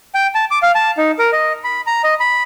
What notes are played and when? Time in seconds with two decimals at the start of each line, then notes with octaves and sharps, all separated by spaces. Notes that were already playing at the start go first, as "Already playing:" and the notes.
0.15 G5
0.35 A5
0.51 D6
0.62 F5
0.75 A5
0.98 D#4
1.19 A#4
1.32 D#5
1.64 B5
1.87 A#5
2.04 D#5
2.20 B5